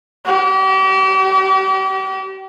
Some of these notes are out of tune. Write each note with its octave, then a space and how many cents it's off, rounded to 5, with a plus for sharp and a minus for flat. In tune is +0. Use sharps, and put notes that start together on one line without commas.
G4 -40